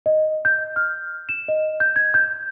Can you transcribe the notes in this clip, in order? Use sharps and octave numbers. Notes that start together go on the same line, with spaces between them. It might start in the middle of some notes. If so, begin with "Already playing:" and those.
D#5
G6
F6
E7
D#5
G6
G#6
G6